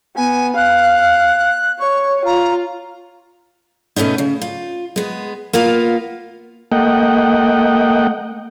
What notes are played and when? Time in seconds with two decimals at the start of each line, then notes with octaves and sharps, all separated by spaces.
0.16 B3 G#5
0.56 F5 F#6
1.80 C#5 C#6
2.25 F4 A#5
3.96 B2 A3 B3 C#4 D#4
4.18 C#3
4.42 F4
4.96 G#3 B3
5.53 A#3 B3 F4 F5
6.72 A3 A#3 D#5 F#5 G5